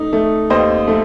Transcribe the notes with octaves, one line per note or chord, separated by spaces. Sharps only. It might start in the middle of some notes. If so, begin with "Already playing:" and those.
Already playing: A3 D#4
A3
D#2 C5 D#5
A3